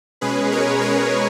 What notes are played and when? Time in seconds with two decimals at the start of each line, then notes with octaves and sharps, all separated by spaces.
0.21 B2 G#3 C#4 G#4 B4
0.52 A#4 C#5
0.81 A#4 C#5